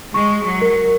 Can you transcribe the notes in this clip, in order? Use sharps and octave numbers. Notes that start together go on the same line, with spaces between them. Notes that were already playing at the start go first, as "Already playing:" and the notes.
G#3 C#6
F#3
A#4